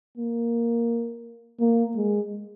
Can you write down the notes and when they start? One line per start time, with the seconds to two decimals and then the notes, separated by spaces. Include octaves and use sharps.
0.18 A#3
1.60 A#3
1.96 G#3